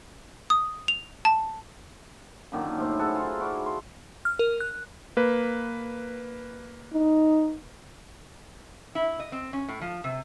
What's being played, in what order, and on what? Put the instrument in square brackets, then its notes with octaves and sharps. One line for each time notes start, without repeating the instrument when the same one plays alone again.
[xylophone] D#6
F7
A5
[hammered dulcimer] F#2 A#2 D3 D#3
A2 C5
G#4 A4 F#5
D#4 F4
E4 F#4 D5 F5
C6
[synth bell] F6
A#4
F#6
[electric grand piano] A#3 B4
[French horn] D#4
[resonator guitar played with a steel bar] E4
D#5
C4
C#4
A2
F3
C3